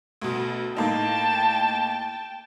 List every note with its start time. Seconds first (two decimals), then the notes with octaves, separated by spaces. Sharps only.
0.22 D2 B2
0.76 A2 A#3 D#4 G5 A5